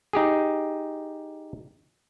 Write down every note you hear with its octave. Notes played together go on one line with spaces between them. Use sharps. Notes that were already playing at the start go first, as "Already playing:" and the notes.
D#4 G4 G#4